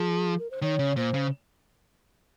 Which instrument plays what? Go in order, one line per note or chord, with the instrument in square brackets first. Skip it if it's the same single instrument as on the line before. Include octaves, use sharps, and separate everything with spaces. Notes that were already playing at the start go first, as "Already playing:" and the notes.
Already playing: [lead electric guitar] F3 [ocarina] G#4
[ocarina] A#4
C5
[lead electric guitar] D#3 [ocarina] C#5
[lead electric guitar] C#3
[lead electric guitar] A#2 [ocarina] C5
[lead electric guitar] C#3